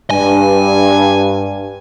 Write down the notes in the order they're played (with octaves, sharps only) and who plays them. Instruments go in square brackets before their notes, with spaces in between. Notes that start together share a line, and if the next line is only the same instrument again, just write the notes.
[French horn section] G2 [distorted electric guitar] G#5